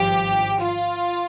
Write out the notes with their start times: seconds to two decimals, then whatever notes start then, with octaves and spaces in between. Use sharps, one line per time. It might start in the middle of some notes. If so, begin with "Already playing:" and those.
Already playing: G#1 G2 F3 G4
0.60 F4